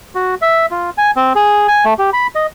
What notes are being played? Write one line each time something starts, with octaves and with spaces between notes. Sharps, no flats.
F#4
E5
F4
G#5
C4
G#4
G#5
A3
G4
B5
D#5